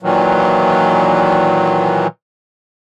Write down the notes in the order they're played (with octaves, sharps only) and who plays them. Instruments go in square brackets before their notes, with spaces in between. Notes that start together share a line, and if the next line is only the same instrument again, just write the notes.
[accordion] A#2 D#3 E3 F#3